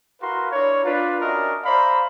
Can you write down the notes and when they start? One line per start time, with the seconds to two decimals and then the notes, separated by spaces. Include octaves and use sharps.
0.22 E4 F#4 A#4 B4 F5 C6
0.52 D4 E4 A#4 C#5
0.85 D4 F4 B4
1.21 C#4 D4 F#4 A#4 D#5 E5
1.65 C5 D5 E5 F5 A#5 B5